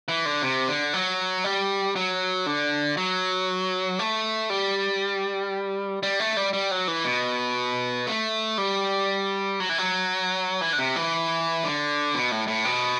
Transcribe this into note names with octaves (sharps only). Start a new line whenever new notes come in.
E3
D3
C3
D3
F#3
G3
F#3
D3
F#3
A3
G3
G3
A3
G3
G3
F#3
E3
B2
A3
G3
F#3
E3
F#3
E3
D3
C3
E3
D3
B2
A2
A2
B2